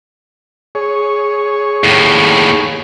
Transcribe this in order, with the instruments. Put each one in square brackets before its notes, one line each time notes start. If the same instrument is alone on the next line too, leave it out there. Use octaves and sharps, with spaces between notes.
[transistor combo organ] G#4 C#5
[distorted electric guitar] D#2 A2